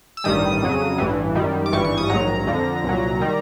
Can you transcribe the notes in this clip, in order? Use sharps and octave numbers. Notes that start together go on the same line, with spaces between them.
E6
A1 G2 D#3 G3 D#6
F2 C#3 F#3
A1 G2 E3
F#2 D#3 G3
D6
G#1 G2 E3 G3 C#6
C#6
D#6
A#1 G#2 D#3 F#3 A#5
F2 D3 F3
C2 A#2 F#3
D#3 G3